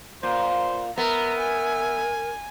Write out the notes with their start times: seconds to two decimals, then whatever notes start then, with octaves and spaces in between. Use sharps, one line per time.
0.23 A#2 C5
0.98 B3 A#4 E5 A#5
1.38 G#5